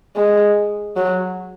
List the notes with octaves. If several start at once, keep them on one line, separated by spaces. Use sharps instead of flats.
G#3
F#3